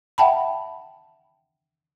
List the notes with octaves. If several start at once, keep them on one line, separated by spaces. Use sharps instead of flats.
E5 F#5 G5 A5 B5